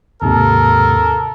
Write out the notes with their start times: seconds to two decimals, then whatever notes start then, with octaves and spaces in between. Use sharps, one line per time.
0.22 D#2 G#2 C3 A4 A#4